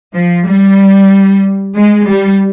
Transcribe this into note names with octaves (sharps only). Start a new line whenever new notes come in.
F3
G3
G#3
G3